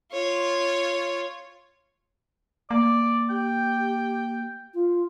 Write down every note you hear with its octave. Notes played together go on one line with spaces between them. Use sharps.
F4 C#5
A#3 D5
G4 G5
F4